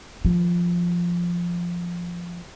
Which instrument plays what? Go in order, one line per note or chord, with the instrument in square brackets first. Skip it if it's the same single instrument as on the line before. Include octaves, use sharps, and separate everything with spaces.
[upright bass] D#3 F3